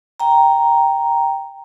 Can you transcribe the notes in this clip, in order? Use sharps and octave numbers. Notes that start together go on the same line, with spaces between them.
G5 A#5